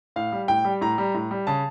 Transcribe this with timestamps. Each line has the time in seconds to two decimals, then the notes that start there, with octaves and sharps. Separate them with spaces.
0.16 A2 F5
0.32 G3
0.48 A2 G5
0.65 G3
0.81 A2 A#5
0.98 G3
1.14 A2
1.31 G3
1.47 C#3 A5